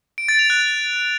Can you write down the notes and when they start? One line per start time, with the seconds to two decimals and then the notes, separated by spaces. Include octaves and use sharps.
0.18 D7
0.29 A6
0.39 F7
0.50 F#6